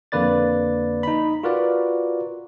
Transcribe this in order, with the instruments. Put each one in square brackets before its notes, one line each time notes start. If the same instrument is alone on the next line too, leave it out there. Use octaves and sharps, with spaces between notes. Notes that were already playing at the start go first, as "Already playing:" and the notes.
[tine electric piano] F2 D3 A#3 B4 D5 A6
D#4 B5
F4 F#4 A#4 B4 D5